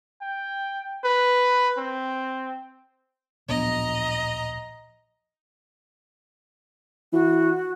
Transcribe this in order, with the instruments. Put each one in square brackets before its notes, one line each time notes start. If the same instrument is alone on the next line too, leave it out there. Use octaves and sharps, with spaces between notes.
[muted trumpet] G5
B4
C4
[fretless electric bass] D1 A#1 B3 [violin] D#5 A#5
[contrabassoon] E3 [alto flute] F#4